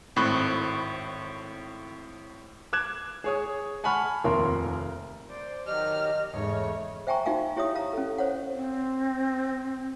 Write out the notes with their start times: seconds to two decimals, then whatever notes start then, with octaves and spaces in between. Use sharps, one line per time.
0.16 G#1 A2 C4 B5 C#6 F#6
2.73 D6 F#6 G#6 E7
3.24 G#4 C#5 D#6
3.84 F#5 G#5 A5 B5 C#6 F6
4.24 F1 D#2 A#2 A#4 C6
5.29 C5 D5
5.67 D#3 F#3 G4 D#5 F6
6.33 E2 G#2 C#3 A3 C#5
7.07 C5 E5 G5 G#5 A#5 C#6
7.25 D#4 F#4 E5 F5 G#5
7.56 E4 G4 C#5 E5 D#6
7.75 F5 A#5
7.93 C#4 A4
8.18 C5 C#5 F#5
8.52 C4